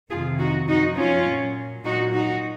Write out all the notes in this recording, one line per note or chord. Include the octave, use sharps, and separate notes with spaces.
F2 C3 D#3 F4 G#4
D#4 F#4
F#2 F3 D#4 F#4
C#4 F4
A#2 F#3
A#2 F#3 D#4 F#4
D#4 F#4